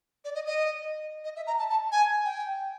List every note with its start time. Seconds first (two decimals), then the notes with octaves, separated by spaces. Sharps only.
0.24 D5
0.35 D#5
0.46 D#5
1.24 D#5
1.36 E5
1.47 A#5
1.59 A5
1.70 A5
1.92 G#5
2.25 G5